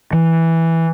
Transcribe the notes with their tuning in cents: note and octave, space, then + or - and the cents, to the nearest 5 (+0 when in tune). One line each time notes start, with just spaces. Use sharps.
E3 -5